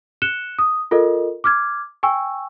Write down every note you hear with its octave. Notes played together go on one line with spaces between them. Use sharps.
F#6 C#7 E7 G7
D#6
F4 A4 A#4 D#5
D6 F6 G#6
G5 G#5 C#6 E6